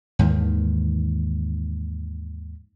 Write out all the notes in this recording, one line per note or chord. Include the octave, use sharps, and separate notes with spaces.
D#2 G#2 D#3 E3